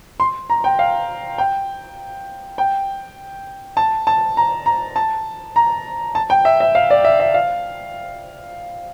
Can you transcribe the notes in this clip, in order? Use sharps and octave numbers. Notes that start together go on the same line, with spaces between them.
C6
A#5
G5
F5
G5
G5
A5
A5
A#5
A#5
A5
A#5
A5
G5
E5
E5
F5
D5
E5
E5
F5